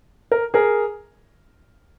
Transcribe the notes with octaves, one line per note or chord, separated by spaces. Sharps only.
A#4
G#4 A#4